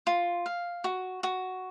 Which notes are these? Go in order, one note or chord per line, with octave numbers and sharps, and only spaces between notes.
F4
F5
F#4
F#4